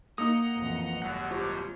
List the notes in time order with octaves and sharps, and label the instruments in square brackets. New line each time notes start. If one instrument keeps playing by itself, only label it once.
[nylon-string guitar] A#3 D#4 [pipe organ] D#5 F#5 A#5 [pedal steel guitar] D#6
[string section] A1 F2
[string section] G#1 G3 [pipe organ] F#2 B2 F#3 [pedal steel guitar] F#5
[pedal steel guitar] F4 G4 C5